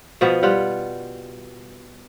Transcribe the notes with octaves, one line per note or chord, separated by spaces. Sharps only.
B2 F3 B3
G3 F4 F#5